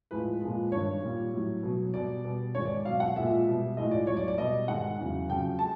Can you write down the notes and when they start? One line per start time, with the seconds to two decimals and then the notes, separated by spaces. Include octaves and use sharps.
0.11 A2 F3 G#3 B4
0.41 A#2 F3 G#3
0.72 G2 D#3 G3 C#5
1.02 A#2 G3
1.33 A2 F#3
1.63 B2 F#3
1.94 B2 G3 D5
2.24 B2 G3
2.55 G#2 D#3 G#3 C#5
2.65 D5
2.85 B2 F#3 F5
3.00 F#5
3.16 A#2 F3 G#3 E5
3.46 B2 G3
3.77 A2 F3 G#3 D#5
3.91 D5
4.07 A2 F#3 C#5
4.17 D5
4.28 D5
4.37 B2 G3 D#5
4.67 G#2 D#3 G#3 F#5
4.98 E2 C#3 F#3
5.29 F2 C#3 F#3 G5
5.59 G#3 A5